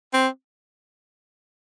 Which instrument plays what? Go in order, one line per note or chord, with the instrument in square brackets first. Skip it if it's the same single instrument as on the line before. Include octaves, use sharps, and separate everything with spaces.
[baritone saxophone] C4